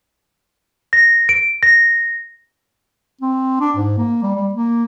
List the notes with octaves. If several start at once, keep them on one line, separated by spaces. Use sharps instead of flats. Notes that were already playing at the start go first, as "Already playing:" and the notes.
A#6
D7
A#6
C4
D4
G#2
A#3
G3
G3
A#3